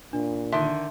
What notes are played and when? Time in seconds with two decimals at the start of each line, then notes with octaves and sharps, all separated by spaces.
0.13 A#2 D4
0.52 D3 D#3 E5 A5 C6